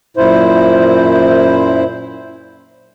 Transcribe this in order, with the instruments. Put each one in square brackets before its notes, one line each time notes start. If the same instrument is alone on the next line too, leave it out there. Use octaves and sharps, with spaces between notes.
[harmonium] F#2 A#2 E4 C5